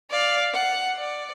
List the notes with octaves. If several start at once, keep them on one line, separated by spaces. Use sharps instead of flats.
D5 F5
F#5
D5